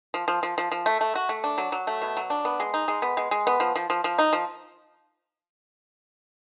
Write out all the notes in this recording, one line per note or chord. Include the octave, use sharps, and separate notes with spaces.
F3
F3
F3
F3
F3
A3
A3
F#4
A3
D4
F#3
F#3
A3
B2
F#3
D4
B3
G#3
D#4
G#3
B3
G#3
G#3
B3
F3
F3
F3
F3
D#4
F3